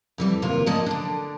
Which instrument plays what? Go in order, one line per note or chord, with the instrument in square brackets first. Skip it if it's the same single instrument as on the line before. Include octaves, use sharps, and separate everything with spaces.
[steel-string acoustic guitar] F2 E3 G3
D#2 C3 A#3 F4
D2 F3 A#3 D5 D#5 A5
D3 D4